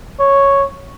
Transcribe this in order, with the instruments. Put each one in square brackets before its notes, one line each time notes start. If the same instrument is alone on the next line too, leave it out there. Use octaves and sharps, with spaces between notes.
[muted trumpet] C#5